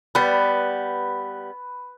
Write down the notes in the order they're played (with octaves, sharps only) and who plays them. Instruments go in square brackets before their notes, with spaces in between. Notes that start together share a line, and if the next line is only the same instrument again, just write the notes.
[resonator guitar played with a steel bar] G3 B3 [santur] B4